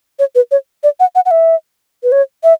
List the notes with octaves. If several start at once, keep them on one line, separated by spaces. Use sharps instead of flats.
C#5
B4
C#5
D5
F#5
F#5
F#5
E5
B4
C#5
E5